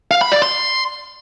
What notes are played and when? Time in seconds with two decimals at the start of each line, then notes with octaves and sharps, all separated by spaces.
0.11 F5
0.21 B5
0.32 D5
0.42 C6